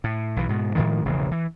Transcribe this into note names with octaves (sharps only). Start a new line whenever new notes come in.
A2
B1 E3
G#2 B2
A2 D#3 F3 G#3
E1 A#1 C#3 E3
E3